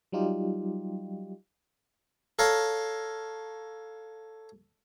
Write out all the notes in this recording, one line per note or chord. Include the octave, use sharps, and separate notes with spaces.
F#3 G3 D#4 F4 G4
A4 C#5 F5 A#5